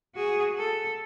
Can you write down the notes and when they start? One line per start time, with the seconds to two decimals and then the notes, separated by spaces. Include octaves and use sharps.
0.15 F#4 G#4
0.57 A4